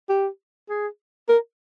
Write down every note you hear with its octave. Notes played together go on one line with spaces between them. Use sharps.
G4
G#4
A#4